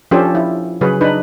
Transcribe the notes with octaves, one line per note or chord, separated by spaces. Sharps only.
F3 C#4 D4 G4 A4 C5
E4 F4
C#3 F#3 G#4 B4 C#5
D4 D#4 B4